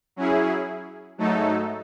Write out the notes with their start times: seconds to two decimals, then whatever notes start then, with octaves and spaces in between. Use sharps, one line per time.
0.16 F#3 C#4 E4 G#4
1.18 G#2 F#3 A3 D#4 A4